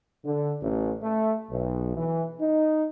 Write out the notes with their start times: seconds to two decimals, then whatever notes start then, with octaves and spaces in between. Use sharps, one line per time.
0.24 D3
0.62 A1
1.03 A3
1.50 B1
1.96 E3
2.40 D#4